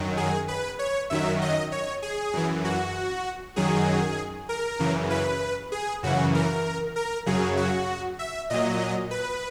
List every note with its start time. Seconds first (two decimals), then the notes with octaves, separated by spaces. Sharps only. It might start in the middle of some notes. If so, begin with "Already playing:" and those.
Already playing: F#2 D#3 F#3
0.17 G#4
0.48 B4
0.79 C#5
1.10 F#2 D#3 F#3 E5
1.41 D#5
1.72 C#5
2.02 G#4
2.33 F#2 E3
2.64 F#4
3.56 F#2 D#3 F#3 G#4
4.49 A#4
4.79 F#2 C#3 E3
5.10 B4
5.72 G#4
6.03 F#2 C#3 E3 F#4
6.35 A#4
6.96 A#4
7.26 F#2 C#3 F#3 G#4
7.57 F#4
8.19 E5
8.50 A#2 F#3 D#5
9.11 B4